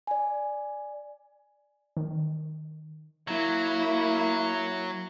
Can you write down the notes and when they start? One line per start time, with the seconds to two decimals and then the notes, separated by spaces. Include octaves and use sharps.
0.07 D5 G#5
1.97 D#3
3.28 F#3 A#3 E4